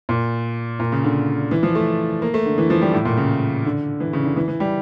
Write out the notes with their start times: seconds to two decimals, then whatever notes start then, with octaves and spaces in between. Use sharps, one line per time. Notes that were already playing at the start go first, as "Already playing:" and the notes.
0.09 A#2
0.80 A#2
0.92 C#3
1.04 D3
1.51 E3
1.63 F3
1.75 A3
2.22 A#3
2.34 A3
2.46 D3
2.58 E3
2.70 F3
2.82 G3
2.93 A2
3.05 A#2
3.17 C#3
3.65 D3
4.00 E3
4.13 C#3
4.24 D3
4.36 E3
4.48 E3
4.60 G3